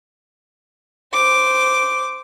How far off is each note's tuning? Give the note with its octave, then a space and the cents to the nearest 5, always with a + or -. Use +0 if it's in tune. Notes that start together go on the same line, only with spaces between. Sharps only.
C5 -15 D6 +0